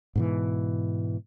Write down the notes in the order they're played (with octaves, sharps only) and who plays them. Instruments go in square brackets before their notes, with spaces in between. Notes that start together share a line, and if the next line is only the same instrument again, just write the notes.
[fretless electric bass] G#2 B2 E3